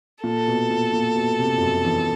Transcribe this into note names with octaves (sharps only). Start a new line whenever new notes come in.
A#2 A4
B2
A#2
A#2
B2
C3
F2
F#2
E2